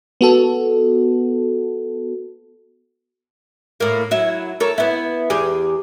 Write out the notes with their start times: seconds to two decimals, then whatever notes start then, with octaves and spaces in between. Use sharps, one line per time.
0.21 B3 F#4 A4
3.80 A2 A#3
4.11 F#3 E4
4.60 A4 A#4 C#5
4.78 B3 E4
5.30 E2 G4 G#4